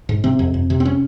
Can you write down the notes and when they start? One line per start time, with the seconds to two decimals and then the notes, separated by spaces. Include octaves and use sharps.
0.09 G#2
0.24 C3 C4
0.39 F2
0.54 F2
0.70 C3
0.80 C4
0.85 C#4